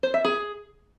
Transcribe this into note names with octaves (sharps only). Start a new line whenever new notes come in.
C5
E5
G#4